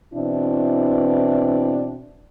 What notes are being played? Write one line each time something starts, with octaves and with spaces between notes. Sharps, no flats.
B2 E3 C4 D4 E4